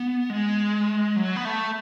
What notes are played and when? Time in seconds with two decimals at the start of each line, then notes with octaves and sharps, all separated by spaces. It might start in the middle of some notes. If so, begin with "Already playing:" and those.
Already playing: B3
0.30 G#3
1.16 F#3
1.36 B3
1.45 A3